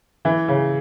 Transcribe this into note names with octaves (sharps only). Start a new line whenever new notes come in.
E3
C#3